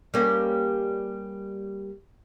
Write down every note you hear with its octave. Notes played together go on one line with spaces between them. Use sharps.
G3 A#3 C#4